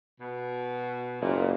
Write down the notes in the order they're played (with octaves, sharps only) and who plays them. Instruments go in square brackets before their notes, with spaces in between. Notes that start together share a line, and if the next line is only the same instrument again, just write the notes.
[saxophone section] B2
[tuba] F#1 [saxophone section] A#2